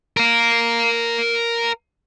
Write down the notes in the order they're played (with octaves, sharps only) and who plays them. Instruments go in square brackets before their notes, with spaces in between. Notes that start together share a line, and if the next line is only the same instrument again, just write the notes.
[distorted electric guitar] A#4 F5